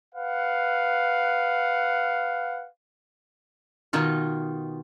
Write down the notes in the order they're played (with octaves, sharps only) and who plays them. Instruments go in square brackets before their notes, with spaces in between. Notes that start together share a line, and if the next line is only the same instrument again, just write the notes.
[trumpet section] B4 F5 F#5
[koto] B2 D#3 D#4 F4